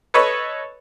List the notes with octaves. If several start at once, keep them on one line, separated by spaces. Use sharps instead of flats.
A4 B4 C#5 D#5 B5 C#6